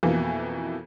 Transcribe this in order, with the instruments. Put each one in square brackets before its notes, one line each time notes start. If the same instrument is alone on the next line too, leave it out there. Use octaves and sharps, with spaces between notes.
[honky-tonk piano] F2 B2 E3 A#3